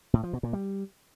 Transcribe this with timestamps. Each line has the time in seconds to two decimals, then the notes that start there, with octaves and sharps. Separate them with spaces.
0.13 A2
0.23 F3
0.33 B2
0.43 A#2
0.53 G3